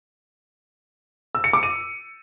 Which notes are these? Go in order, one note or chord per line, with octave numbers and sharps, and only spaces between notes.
E6
C#7
D6
D#7